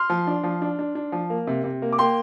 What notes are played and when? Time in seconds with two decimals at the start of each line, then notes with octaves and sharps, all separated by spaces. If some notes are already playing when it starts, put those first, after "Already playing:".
Already playing: C6 F6
0.10 F3
0.27 D4
0.43 F3
0.62 D4
0.79 D4
0.95 D4
1.12 F3
1.30 A#3
1.47 C3
1.64 C3
1.82 A#3
1.92 D6
1.98 A#3 G5 C6